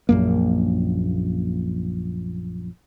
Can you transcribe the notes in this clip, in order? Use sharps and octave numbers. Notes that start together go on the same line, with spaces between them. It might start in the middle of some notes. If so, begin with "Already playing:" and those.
A#1 F#2 A#3